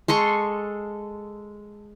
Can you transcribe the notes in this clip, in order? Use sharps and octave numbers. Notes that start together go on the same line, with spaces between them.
G#3 A4 C6 C#6